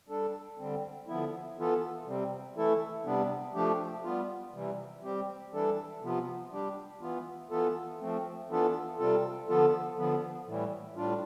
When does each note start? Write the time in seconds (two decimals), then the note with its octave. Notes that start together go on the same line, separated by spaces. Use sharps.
0.09 G3 D4 A4
0.58 D3 G3 C4
1.08 D3 F3 B3 E4
1.57 E3 B3 F4 A4
2.07 C3 G3 C4
2.56 E3 A3 E4 A4
3.05 C3 G3 B3 D4
3.55 F3 A3 D4 G4
4.04 G3 B3 F4
4.54 C3 E3 G3
5.03 G3 C4 G4
5.52 E3 G3 D4 A4
6.02 C3 F3 B3 F4
6.51 G3 D4 G4
7.01 E3 B3 F4
7.51 E3 B3 F4 A4
8.00 F3 A3 C4
8.49 E3 B3 D4 F4 A4
8.99 C3 G3 C4 F4 A4
9.49 D3 F3 B3 F4 A4
9.98 D3 F3 B3
10.47 A2 E3 G3
10.96 A2 G3 D4 F4